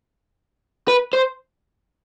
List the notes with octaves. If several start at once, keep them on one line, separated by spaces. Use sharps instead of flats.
B4
C5